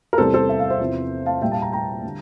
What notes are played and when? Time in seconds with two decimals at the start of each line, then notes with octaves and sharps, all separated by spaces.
0.13 A#4
0.18 E2 C3 G3 A4 C5
0.34 A4 C5
0.49 E5
0.59 F5
0.70 C5 E5
0.80 E2 C3 F3
1.26 F5 A5
1.42 A#2 G3 E5 G5
1.52 F5 A5
1.62 G5 A#5
1.72 G5 A#5
2.03 D3 G3